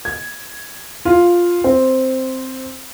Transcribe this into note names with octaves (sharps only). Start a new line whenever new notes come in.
G#6
F4
C4